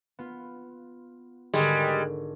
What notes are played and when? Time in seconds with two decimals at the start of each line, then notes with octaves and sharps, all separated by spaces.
0.19 B3 F4
1.54 G#1 D3 G3 G#3